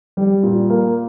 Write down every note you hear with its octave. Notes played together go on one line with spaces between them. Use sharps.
G3
A#2
A#3